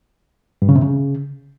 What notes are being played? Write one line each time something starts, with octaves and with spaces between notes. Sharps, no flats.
G2
C#3
C3
C#3